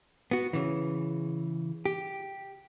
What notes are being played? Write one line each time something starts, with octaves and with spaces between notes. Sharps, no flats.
B3 F#4
C#3 E3
G4